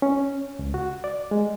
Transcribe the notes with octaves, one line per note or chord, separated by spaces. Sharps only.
C#4
C#2
F#4
D5
G#3